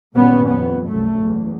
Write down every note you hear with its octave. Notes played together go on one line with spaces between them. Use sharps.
G#1 G2 A#2 G3 B3 C#4
F2 B3
C2 F#2 A3
F#1 E2